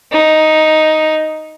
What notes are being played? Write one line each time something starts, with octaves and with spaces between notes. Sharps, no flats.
D#4